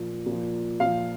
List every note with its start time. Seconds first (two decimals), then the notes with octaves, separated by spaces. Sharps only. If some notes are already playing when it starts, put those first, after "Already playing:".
Already playing: A#2 F3
0.26 A#2
0.31 F3
0.80 A#2 F3 F5